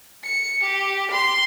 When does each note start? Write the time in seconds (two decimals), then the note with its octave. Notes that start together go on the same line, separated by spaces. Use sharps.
0.24 C#7
0.63 G4
1.11 C6